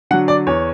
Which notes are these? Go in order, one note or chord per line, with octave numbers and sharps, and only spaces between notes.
D3 F#3 F#5
D5
E2 C#5